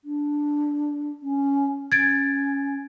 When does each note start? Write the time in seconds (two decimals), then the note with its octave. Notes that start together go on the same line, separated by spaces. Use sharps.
0.04 D4
1.22 C#4
1.92 C#4 G#6 A6 D7